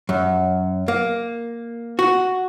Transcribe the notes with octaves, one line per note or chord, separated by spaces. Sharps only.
F#2
A#3
F#4